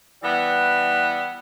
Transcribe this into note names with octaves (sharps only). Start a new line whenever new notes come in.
E3 G3 B3